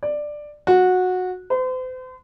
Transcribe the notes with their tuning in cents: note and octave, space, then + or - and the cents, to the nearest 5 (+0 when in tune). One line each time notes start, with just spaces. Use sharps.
D5 +10
F#4 -15
C5 -40